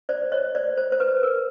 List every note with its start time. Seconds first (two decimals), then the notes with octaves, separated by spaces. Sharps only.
0.09 C5 D5
0.32 C#5 D#5
0.55 C5 D5
0.77 C5
0.92 C5
1.00 B4
1.23 A#4